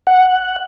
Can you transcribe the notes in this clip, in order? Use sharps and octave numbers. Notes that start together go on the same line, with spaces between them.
F#5